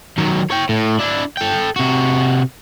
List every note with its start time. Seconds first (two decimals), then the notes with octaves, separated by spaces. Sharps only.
0.18 D#3 F#3
0.50 C#5 G5
0.69 A2
1.00 D4 E4
1.37 A4 G5
1.76 C3 F#4